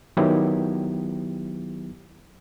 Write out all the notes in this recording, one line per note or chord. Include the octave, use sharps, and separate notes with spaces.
D#3 F#3 B3 E4 G4